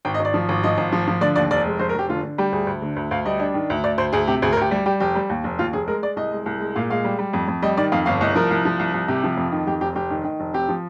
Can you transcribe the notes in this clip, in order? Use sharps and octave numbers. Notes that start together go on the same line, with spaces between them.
G#1 G5
D#5
G#1
D5
F3
G#1
F3 D#5
G#1
F3
F3
D3 D5
D#2 D5
F1 D5
G#3
F1 C5
A#4
F1 G4
D3 F4
D3
G3 G4
D2 G#4
D2
D3
D2
D2 F5
G3 D#5
D4
D#3
D2
D2 D5
D2 C5
D2 G#4
C3 G4
D2 G#4
A#4
D2 G4
G3
G3 G4
F1 G4
G3
D#2
F1
D#2 F4
F1 G#4
G#3 A#4
G#3 D5
C2 D#5
G#3
C2
G#3
A#2 F5
G#3 F5
G3
G3
F2
F2
G3 D#5
D#3 D5
F2 F5
G1 F5
C2 D#5
F3 A#4
C2
F3
C2
C2
C3 G4
F3
F2
D#3
F2 G4
F1 G4
F1 G4
D#3
D#3
F1
C4 G4
F3